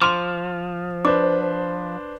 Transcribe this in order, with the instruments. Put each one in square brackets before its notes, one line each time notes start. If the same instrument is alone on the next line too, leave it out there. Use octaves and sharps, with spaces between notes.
[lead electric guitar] F3 [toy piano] C6 D6 [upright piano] F6 F7
[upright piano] D4 B4 C5 [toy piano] D6